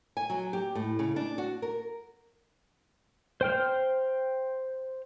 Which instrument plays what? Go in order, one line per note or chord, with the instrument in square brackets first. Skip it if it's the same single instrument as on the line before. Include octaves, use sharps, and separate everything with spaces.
[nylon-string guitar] G#5
F#3
G4
A2
C#3
D4
F#4
A#4
[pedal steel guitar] C5 G5 F6